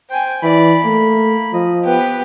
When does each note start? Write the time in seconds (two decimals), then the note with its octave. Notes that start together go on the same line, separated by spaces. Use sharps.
0.10 C5 G5 G#5
0.43 E3 D5 B5
0.85 A3 A#3
1.53 F3 D#5
1.85 B3 G4 B4